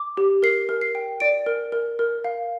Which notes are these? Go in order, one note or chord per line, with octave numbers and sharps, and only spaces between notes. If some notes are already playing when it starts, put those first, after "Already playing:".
Already playing: D6
G4
A#4 C7
A#4
C7
G5
D5 D7
A#4
A#4
A#4
F5